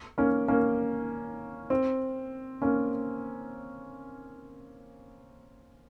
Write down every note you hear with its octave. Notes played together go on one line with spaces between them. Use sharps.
A#3 C#4
A#3 C#4
C4
A#3 C#4